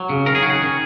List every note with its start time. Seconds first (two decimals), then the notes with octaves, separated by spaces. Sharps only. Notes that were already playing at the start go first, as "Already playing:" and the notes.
Already playing: F#3
0.09 C#3
0.26 D#3 A#4
0.35 G#4
0.43 C#4 F#4
0.50 G#4
0.62 D#3